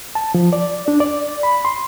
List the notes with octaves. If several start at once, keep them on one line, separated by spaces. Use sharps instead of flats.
A5
F3
D5
D4
D5
B5
C6